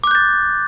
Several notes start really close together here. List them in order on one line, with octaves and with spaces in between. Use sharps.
D6 F#6 G6 A6